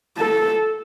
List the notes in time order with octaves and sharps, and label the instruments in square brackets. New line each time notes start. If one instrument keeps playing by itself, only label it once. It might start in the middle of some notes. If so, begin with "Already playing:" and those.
[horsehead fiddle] A4